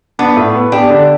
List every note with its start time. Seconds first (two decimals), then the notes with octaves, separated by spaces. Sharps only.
0.19 B3 D4
0.36 A2
0.54 B3
0.72 D4 G4
0.90 D3